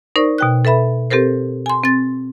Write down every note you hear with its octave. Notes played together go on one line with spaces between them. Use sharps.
D#4 A#4 C5 D5 C#6
B2 G5 F#6
A4 B4 E5 B5
C4 G4 A4 A#4 C5
G#5 C6
C4 A6